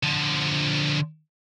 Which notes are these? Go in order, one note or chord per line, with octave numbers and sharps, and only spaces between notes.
D3 F3